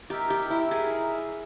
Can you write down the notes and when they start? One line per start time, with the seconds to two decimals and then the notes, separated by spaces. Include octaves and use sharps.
0.10 D#4 G4 A#4 E5
0.30 G4
0.50 E4
0.70 D#4 G#4 A#4 E5